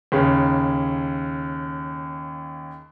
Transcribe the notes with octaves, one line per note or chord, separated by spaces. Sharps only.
D#2 C#3